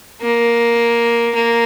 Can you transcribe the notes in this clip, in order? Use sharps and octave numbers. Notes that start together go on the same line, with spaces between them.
A#3
A#3